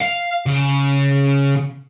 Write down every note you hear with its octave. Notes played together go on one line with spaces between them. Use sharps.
F5
C#3